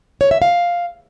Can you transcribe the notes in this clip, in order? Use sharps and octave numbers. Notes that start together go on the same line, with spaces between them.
C#5
E5
F5